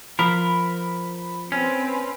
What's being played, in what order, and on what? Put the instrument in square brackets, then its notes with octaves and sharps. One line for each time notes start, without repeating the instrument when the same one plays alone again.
[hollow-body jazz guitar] F3 [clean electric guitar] A#4 [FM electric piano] B5
[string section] C4 B4 [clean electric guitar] C#4